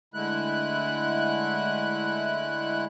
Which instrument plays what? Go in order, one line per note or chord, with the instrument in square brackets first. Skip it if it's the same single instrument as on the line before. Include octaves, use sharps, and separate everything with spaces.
[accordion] D3 G#3 A3 E4 F#6